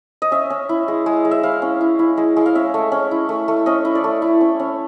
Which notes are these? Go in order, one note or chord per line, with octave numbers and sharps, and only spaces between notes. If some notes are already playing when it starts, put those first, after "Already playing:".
D#5
C#4 E5
C#4
E4
G#3
G#3
G#3
E5
E4 F5
C#4
E4
E4
G#3
G#3
F5
C#4 E5
A3
C#4
E4
A3
A3
C#4 D#5
E4
D5
A3
E4
C#4
C#4